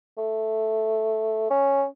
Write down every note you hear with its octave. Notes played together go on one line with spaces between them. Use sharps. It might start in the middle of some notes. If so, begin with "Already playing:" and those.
A3
C#4